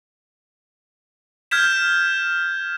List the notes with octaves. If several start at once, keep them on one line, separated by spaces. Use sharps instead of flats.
F6 G6 G#6 B6 E7